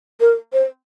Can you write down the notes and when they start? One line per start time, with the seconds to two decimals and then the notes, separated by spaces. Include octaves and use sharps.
0.20 A#4
0.53 C5